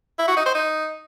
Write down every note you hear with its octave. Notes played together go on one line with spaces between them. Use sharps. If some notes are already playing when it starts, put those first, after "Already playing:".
E4
F#4
D#4
C5
D#4